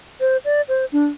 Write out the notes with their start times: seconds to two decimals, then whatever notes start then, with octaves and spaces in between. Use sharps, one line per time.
0.20 C5
0.45 D5
0.68 C5
0.92 D4